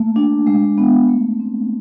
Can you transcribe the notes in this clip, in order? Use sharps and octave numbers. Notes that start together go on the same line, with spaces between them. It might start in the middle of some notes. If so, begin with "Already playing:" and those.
Already playing: A3 A#3
D4
G#3
B3
A3
C4